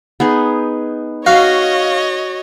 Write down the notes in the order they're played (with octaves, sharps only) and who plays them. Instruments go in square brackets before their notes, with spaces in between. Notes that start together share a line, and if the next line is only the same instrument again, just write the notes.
[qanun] B3 D#4 G#4
[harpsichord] F#4 [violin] C#5 D#5 [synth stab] F5